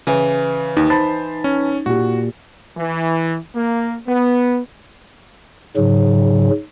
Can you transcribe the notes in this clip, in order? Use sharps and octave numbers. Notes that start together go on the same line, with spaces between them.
C#3 E3
D#2 D#4
C5 A5 B5 A6
C#4
A#2 F#4 G4
E3
A#3
B3
G#2 C#3 F#3